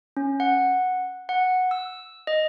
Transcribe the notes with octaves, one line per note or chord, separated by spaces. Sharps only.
C#4
F#5
F#5
E6
D#5